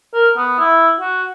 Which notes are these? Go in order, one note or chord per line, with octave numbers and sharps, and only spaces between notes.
A#4
B3
E4
F#4